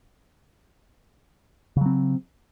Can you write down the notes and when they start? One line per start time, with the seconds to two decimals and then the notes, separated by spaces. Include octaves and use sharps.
1.77 C#3
1.81 F#3
1.86 C4